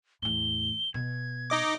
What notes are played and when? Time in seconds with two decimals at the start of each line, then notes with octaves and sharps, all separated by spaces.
0.22 E2 A2 G7
0.94 B2 G#6
1.50 D#4 D#5 D6